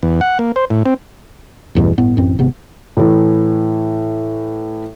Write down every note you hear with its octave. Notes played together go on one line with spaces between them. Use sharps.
E2
F#5
A#3
C5
A2
C4
A1 E2 G2 B2
G1 A2 B3
A1 F#2 C4
G#1 C3 B3
A2 E3